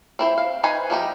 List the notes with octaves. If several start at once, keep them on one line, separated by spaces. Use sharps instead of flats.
C4 E4 C5
F5
D#4 B4 C5 G#5
F3 G3 D#4 G4